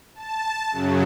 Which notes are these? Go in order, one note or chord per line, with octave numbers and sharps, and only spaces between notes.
A5
F#2 C#3 F#3